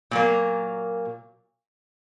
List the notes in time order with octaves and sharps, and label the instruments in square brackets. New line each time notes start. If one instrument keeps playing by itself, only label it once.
[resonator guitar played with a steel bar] A#2 F#3 A#3